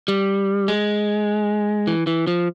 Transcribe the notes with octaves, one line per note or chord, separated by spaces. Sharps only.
G3
G#3
E3
E3
F3